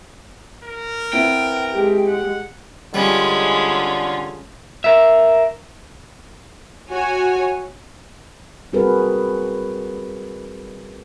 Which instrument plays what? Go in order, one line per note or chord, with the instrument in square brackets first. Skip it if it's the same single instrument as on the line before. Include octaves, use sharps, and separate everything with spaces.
[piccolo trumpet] A#4
[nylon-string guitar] B3 C4 E4 [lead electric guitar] G5
[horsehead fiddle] G#3 G4
[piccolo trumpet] F#5
[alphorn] D3 [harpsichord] G3 [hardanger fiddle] G#3 B5 [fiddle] C#4 F4
[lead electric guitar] A#4 E5
[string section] F#4 C#5 G#5
[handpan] G3 C4 F#4 G#4 A#4 B4